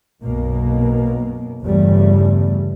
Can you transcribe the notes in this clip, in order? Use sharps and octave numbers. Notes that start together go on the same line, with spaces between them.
B1 F#2 B2 A#3
G1 E2 G2 C#3 G3 A3